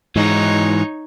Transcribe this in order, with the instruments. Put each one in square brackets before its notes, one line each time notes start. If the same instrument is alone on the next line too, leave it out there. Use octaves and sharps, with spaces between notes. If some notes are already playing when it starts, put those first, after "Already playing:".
[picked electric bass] G#2 [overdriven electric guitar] E3 G#3 [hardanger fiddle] D#4 C#5